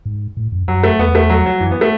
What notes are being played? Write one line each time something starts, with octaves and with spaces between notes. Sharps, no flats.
G#2
A2
F#2
F#2 F#3
A3
E2 B3
A3
F#3
F#3
F#2 E3
B3
A3